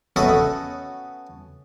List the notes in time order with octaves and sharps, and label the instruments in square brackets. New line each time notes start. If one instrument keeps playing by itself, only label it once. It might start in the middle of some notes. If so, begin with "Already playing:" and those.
[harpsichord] B3 C#4 F#4 A4 D#5 E5